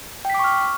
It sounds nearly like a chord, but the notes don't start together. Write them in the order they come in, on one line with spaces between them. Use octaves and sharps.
G5 B6 D6 C#6 F6